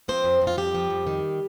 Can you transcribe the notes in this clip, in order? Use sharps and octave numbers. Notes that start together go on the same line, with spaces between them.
F3 C4 C5
F2
F2
F4
F2 G3 G4
F3
F2
D#3